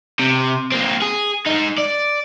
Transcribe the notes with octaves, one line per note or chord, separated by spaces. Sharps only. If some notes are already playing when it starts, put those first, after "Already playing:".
C3
A#3 C4
G#4
G#3 D#4
D5